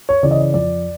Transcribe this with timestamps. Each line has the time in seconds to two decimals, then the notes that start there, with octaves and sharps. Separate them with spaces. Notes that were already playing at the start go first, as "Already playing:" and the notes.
0.09 C#5
0.23 C#3 E3 D5
0.31 D#5
0.39 D5
0.54 F2 D5